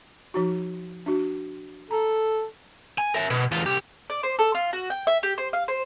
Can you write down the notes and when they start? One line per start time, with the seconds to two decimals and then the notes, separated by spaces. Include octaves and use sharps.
0.34 F3 D#4 F#4
1.06 D4 F#4
1.91 A4 A#5
2.98 G#5
3.14 A#4 E5
3.30 B2
3.52 E2 F4
3.66 C2 G4
4.10 D5
4.23 C5
4.39 A4
4.55 F4
4.73 F#4
4.90 G5
5.07 E5
5.23 G4
5.38 C5
5.53 F5
5.68 C5